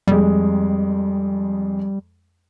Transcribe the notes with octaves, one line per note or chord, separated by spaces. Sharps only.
F2 G3 G#3